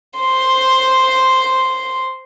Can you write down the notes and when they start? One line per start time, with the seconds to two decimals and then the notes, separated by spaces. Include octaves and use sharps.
0.19 C5 C6